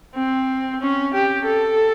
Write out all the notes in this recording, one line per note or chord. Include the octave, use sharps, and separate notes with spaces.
C4
C#4
G4
A4